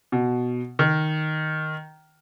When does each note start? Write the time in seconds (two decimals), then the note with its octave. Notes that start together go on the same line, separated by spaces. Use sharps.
0.12 B2
0.79 D#3